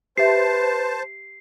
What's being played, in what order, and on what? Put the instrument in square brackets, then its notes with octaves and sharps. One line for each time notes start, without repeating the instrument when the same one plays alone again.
[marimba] G4 E5 [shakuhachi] B4 [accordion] C5 A5 [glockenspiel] C7